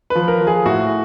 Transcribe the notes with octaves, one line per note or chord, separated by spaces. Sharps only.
B4
F3
A#4
F3
G#4
A2 F#4